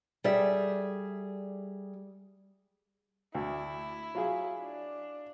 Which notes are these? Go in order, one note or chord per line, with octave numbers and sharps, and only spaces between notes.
G3 G#4 A4 D5 E5
D2 E4
F#3 F4 G#4
D4